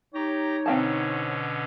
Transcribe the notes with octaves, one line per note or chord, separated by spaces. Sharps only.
D#4 G4 C#5 A#5
B2 D3 C4 C#4 F5 A5